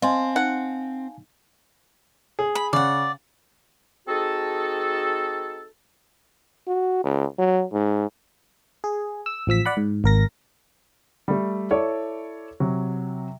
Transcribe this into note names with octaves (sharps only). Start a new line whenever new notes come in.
C4 D#5 F5 G#5 A5 C6
D#4 F#5
G#4
B5
C#3 D5 F#5
C4 D#4 F#4 G#4 A4
F#4
C#2
F#3
G#2
G#4
E6
A1 F3 E6 B6
D5 F#5 B5
G#2
G#1 A#4 A#6
G3 A3
E4 A4 C#5 D5
C3 F#3